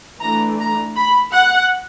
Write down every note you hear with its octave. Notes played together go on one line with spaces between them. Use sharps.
E3 A3 D4 A#5
A#5
B5
F#5